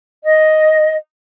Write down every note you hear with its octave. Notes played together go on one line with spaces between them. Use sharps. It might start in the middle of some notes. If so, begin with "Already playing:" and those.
D#5